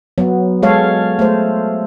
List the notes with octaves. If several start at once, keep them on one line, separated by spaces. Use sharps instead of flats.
F#3 B3
G#3 A4 C#5 F5
A3 C5